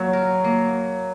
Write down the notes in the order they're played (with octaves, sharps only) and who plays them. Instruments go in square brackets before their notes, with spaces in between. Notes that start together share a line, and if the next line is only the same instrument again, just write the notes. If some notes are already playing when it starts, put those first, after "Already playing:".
Already playing: [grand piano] F#3 [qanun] A#3 F#4
[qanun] A#4
A#3